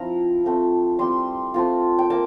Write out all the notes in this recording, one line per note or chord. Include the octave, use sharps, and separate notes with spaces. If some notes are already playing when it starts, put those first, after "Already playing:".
Already playing: F3 C4 E4 A#5
F3 A3 C4
G3 C4 E4 C6
A3 C4 F4
G5
A#3 A5